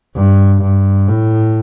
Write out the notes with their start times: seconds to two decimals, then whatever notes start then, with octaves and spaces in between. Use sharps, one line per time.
0.16 G2
0.62 G2
1.08 A2